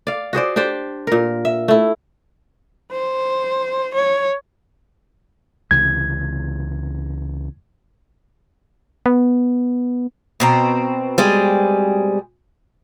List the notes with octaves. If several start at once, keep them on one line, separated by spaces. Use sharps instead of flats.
D5 F5
F#4 G#4 C5 D5
D4 G4 C5 D5
A#2 A#4
E5
A3 E4
C5
C#5
C#2 C3 E3 G#6
B3
B2 C4 A#5
G3 G#3 G#4